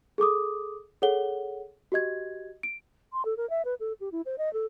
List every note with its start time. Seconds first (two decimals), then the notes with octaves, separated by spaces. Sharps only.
0.18 G#4 A4 D6 D#6
1.02 G#4 A4 C#5 F#5 G7
1.92 F#4 G4 D#5 G#6
2.63 D7
3.13 C6
3.25 A4
3.37 A#4
3.50 E5
3.65 B4
3.80 A4
4.00 G4
4.12 E4
4.26 C5
4.38 D#5
4.53 A4